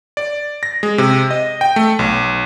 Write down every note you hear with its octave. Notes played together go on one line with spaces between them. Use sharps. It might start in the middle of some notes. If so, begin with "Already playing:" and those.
D5
A#6
G#3
C3
D#5
G5
A3
B1